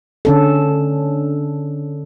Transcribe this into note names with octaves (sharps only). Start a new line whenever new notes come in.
D3 C#4 A4